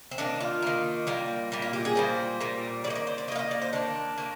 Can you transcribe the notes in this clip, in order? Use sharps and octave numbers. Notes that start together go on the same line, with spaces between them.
C4
D#3 A#3 D4
F4
D#3 A#3
A#2 G3 A#3
A#2 G3 A#3
F4
G4
G#4
A#2 G3 A#3 C5
A#2 G3 A#3
D#3 A#3 D5 D#5
D5
C5
D5
D#3 A#3 D#5 F5
D#5
D5
C5
D#3 A#3 D4
D#3 A#3